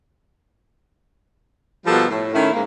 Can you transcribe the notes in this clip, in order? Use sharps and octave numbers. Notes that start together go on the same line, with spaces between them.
B2 F3 G3 A#3 A4
A2
A2 D#3 C#4 E4
G#2 A#3